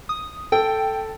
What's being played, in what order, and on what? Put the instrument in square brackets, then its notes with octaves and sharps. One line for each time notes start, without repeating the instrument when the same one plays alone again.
[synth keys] D#6
[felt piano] A4 [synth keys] G5